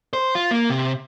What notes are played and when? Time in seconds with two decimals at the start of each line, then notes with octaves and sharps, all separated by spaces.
0.13 C5
0.35 F4
0.51 A#3
0.70 C3